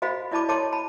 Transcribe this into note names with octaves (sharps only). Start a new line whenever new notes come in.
F#4 C5 D#5 F5 B5
E4 D5 D#5 A5 B5 D6
C#5 D#5 A5 C6 D6
A5 B5